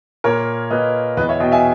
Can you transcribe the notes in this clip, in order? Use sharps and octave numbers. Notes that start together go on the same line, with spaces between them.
A#2 A#4 C#5
A#2 B4 D#5
E2 B4 D#5
C#5 E5
B2 D#5 G5
E5 G#5